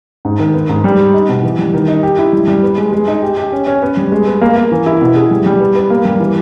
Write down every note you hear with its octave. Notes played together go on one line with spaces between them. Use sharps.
G#2
D#3
B3
G#2
G3
G4
D#4
B2
E3
G3
D#3
D#4
G4
E4
G3
G3
B3
G#3
G#3
D#4
G4
G4
C#4
C#4
B3
G3
G#3
B3
A#3
A#3
E3
E4
B2
G#4
G3
G3
B3
B3
A#3
G3
E3